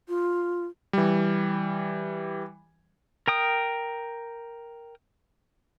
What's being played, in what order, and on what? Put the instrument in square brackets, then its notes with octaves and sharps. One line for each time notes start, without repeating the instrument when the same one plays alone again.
[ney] F4
[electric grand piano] E3 G3
[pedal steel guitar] A#4 G5 D#6